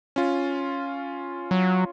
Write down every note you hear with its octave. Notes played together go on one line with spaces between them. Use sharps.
C#4 F4
F#3